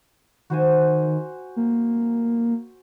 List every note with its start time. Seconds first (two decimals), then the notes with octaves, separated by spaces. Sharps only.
0.50 D#3 F#4 C5 G#5
1.56 A#3